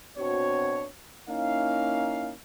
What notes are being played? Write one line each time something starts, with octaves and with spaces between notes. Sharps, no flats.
B2 C4 D4 F#4 C#5
A#3 C#4 D#4 E4 F5